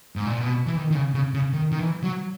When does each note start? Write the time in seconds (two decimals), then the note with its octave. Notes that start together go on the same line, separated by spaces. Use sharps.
0.16 G#2
0.26 A#2
0.39 B2
0.66 E3
0.77 D#3
0.90 D#3
0.95 C#3
1.14 C#3
1.34 C#3
1.53 D#3
1.72 D#3
1.79 E3
2.03 F#3